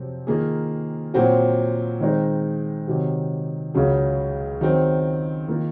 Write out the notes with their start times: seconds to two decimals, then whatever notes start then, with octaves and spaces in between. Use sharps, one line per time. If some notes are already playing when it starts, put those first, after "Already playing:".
Already playing: F2 C3 F#3 C4
0.27 D#3 A#3 F4 G#4
1.14 A#2 F#3 C4 F#4
2.00 D#3 G#3 C4 D#4
2.87 C3 D#3 F#3
3.74 C#2 C#3 F#3
4.61 D#3 F#3 C4
5.48 D#3 A#3 F4